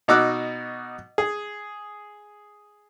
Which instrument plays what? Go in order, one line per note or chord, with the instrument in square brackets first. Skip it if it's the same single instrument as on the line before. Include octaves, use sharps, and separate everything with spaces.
[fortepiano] B2 D#4 F#4 D6 E6 F#6
G#4